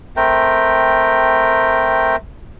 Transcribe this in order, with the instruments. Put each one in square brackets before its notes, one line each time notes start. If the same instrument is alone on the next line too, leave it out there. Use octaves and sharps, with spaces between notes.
[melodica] A3 C4 A#4 G5